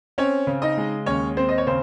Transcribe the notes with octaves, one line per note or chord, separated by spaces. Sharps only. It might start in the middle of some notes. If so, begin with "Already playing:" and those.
C4 C#4 C#5
C#3
D#4 D#5
G#3
D#2 C#4 C#5
C4 C5
D#5
C#5
C#3 C4 C5